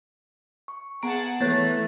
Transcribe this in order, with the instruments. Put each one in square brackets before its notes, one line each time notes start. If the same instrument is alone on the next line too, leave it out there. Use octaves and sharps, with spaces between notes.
[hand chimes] C#6
[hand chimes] B3 A#5 D7 [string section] G#4 F#5 A5
[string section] E3 A3 [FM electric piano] B3 C#5 F#6 [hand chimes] A6